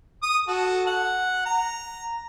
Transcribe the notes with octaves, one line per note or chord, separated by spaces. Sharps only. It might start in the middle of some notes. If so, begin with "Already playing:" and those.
D#6
F#4 A4
F#5
A#5